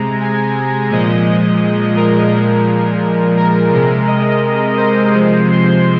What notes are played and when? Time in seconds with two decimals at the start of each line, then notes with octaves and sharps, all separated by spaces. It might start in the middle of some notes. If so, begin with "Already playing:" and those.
Already playing: C3 G#3 A#5
0.21 G#5
0.91 A#2 F3 G#3 D#5
1.97 A#4
2.31 A#2 F3 G#3
3.37 A#4
3.72 C3 G#3 A#4
4.07 D#5
4.77 C5
5.12 C3 F3 G#3
5.48 C6